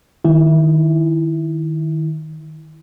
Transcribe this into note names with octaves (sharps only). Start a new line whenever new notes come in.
D#3 E4